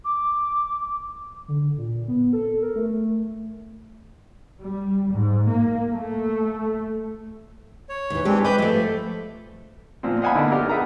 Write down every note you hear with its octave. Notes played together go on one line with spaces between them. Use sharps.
D6
D3
A#2
B3
A4
A#4
A3
G3
G#2
A#3
A3
C#5
D#2 E3
E3 G#3 A#3 C4 D4 G4
B4 D#5 B5 D6 G6
F3 A3 E5
A#2 F3 C4
D#5 F5 F#5 G#5 A5 B5
D3 A#3 B3 D#4 E4
D4 G4 A#4 D5
B3 G#4 E5 A#5